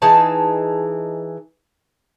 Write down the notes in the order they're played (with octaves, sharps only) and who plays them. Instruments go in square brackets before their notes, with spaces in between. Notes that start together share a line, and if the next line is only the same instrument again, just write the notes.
[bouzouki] E3 D#4 G#4 A5